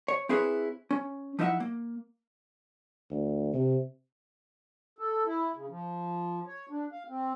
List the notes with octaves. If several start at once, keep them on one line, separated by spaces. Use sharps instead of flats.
C#5
C4 E4 G#4 B4 C#5
C#4
F3 D#4 E4 D#5 E5 F#5
A#3
D2
C3
A4
E4
C#3
F3
C#5
D4
F5
C4